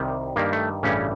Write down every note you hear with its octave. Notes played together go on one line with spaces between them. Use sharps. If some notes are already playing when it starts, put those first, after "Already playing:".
Already playing: C2 C3 D#3 G3
G2 D#3 G3 A#3
A3
A1 G2 C#3 E3 G3 C#4